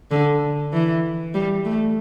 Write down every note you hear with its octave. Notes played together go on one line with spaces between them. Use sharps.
D3
E3
G3
A3